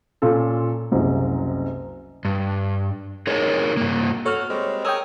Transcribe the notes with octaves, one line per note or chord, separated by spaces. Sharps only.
A#2 C#4 F4 A4
F#1 C2 F#2
G2
D#4 G#4 A#4 C#5
G2 A#3
B3 F#4 A4 C#5 F6
G3 G#3 C4
G#4 A#4 C#5 G5 D#6 E6